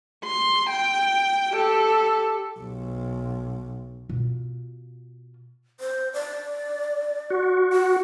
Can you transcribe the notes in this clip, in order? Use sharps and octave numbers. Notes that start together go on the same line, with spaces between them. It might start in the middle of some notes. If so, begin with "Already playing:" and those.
C6
G5
G4 A4
B1
B2 F4
C5
D5
F#4
F#5